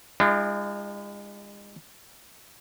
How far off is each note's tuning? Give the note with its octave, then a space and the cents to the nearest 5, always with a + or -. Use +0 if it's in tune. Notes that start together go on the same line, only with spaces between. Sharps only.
G#3 -35 D4 +40 F4 -45